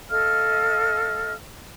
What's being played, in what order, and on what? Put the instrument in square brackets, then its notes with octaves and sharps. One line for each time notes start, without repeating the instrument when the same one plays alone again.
[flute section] A4 D#5 F5 F6